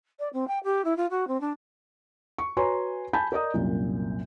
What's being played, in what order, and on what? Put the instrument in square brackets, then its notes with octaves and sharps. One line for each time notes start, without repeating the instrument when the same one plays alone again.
[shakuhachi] D5
C4
G5
G4
E4
F4
F#4
C4
D4
[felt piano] C#6
F#4 B4 C#5 G#5 A#5 C6
G#5 A5 B5 G6
A#4 D5 D#5 A#5 D#6
C2 F#2 A#2